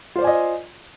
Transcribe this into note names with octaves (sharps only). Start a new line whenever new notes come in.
F4 C5 D5 D#5 G#5